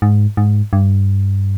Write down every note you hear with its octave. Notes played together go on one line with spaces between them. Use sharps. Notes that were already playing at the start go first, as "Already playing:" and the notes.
G#2
G#2
G2